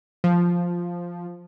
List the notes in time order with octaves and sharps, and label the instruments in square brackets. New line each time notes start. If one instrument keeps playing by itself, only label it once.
[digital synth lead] F3